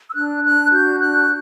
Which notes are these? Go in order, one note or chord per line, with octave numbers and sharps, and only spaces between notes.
E6
D4 F#6
D4 F#6
F#4 G6
D4 F#6